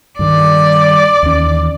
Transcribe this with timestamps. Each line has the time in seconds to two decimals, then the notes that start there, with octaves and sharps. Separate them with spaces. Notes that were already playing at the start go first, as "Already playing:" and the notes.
0.19 G2 D#3 G3 D5
1.23 D#2 E3 C#4